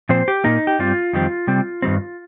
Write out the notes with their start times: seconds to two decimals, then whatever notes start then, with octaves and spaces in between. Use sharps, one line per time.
0.09 A#2 F3 C4 C5
0.28 G4
0.44 A#2 A#3 D#4
0.67 G4
0.79 G2 G3 C4 F4
1.13 F2 D#3 G3 C4
1.47 C3 G3 C4
1.82 G2 D#3 G3 C4